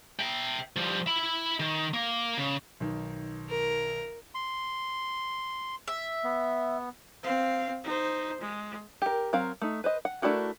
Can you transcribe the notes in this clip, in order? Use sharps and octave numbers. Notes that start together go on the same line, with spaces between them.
E5 G5
F3 G3
E5 B5
D#3
A#3
C#3
B1 D#3
A#4
C6
E5
B3
C4 F5
D#4 C5
G#3
G4 A#4
F#3 C4 A#4 F5
A3 D#4
B4 C5 D#5
F#5
A3 D4 E4 F#4 A#4